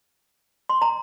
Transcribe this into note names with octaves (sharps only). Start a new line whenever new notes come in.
C6
A#5